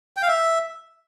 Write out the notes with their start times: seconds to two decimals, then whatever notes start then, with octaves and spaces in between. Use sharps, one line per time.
0.17 G5
0.22 F5
0.28 E5